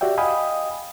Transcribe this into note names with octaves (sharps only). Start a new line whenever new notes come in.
F#4 G4 D5 E5 G5
D#5 F5 G5 G#5 B5 D#6